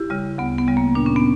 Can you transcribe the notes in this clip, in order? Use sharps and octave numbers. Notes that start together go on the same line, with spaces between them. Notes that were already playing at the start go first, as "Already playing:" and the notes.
Already playing: E4 G4
C#3 G3
D2 B3
B3
C#3 G3
A#3
A#2 D4
C#4
B3